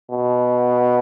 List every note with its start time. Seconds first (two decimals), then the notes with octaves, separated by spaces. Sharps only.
0.11 B2